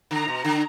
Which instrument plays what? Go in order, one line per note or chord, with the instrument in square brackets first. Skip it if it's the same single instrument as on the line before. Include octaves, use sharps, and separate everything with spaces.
[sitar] D3 [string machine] A#5
[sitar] B2
D3